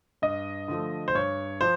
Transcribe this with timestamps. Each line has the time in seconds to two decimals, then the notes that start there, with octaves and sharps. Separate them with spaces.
0.22 G2 D#5
0.68 D3 F3 A3
1.08 C5
1.15 G2 C#5
1.61 F3 C5